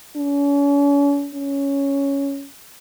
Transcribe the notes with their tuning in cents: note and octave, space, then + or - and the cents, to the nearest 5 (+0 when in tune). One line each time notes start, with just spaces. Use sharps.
C#4 +40
C#4 +5